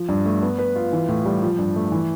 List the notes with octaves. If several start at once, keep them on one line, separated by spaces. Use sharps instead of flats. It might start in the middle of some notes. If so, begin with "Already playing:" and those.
Already playing: F3
G2
A3
B3
B4
F4
E3
A2
G3
F3
G2
A3
E3